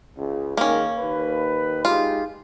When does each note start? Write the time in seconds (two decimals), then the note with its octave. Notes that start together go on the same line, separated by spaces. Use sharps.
0.17 C#2
0.57 D#3 G#3 A#3 C#4
0.98 D#2 B4
1.85 G#3 D#4 F4 G4